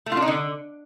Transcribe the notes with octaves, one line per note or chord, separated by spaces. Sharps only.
A3
F4
D4
D#4
D3